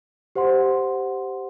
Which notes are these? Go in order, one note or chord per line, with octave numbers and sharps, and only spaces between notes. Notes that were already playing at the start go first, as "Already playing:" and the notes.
G4 C5 F#5 C6